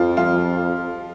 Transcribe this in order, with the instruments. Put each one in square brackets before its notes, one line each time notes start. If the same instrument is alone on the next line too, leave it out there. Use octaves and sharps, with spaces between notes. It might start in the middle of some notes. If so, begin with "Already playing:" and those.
Already playing: [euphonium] F2 [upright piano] F3 F4
[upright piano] F3 F4